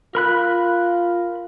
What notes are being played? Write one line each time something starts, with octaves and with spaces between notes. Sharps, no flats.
F4 A#4 B5 F#6